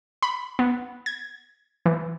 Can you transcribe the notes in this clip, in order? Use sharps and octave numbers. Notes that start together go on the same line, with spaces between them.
B5
B3
G#6
E3